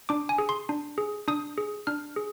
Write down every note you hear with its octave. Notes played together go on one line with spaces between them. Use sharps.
D4 D6
G#5
G#4
C6
D4
G#4
D4 D#6
G#4
D4 F6
G#4